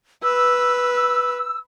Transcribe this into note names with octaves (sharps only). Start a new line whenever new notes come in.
B4 E6